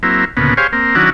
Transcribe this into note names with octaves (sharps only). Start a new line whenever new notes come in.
F#3 A#3 C4 E4
D2 A#2 C#3 B3
G4 G#4 C5 C#5 F5
A#3 C4
D#3 F#3 C#4 D4 E4 F#4